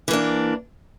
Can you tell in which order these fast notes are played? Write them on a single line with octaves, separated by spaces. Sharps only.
E3 A#3 D4